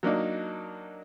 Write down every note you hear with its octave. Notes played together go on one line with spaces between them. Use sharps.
F#3 A#3 D4 D#4